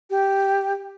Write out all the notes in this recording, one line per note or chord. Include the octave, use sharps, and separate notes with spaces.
G4